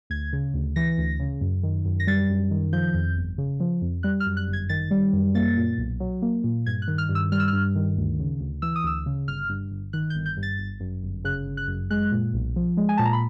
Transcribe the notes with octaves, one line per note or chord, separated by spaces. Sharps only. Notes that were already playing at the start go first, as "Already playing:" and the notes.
D2 G#6
C#3
D2
E3 A#6
D2
C#3
F#2
D#3
F#2
A#6
G3 A6
F#2
D#3
F3 G6
F2
G1
C#3
F3
F2
G3 F#6
F6
F#2
F#6
G1
G#6
D#3 A6
G3
F#2
A#3 A6
A#2
B1
F#3
A#3
A#2
G2 G#6
F#6
D#3
F6
G2
E6
G3 F6
E6
F6
G2
D#3
D2
C#3
D2
E3 E6
D#6
D2 E6
C#3
G1 F6
G2
G1
D#3 F#6
G6
G1
G6
G2
A6
G1
F#2
G1
C#3 F#6
G1
F#6
F#2
G#3 F#6
A#2
B1
F3
G#3
G#5
A#2 A5
A#5
B5